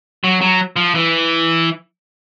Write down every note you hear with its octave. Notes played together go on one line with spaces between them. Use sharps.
F#3
F#3
F3
E3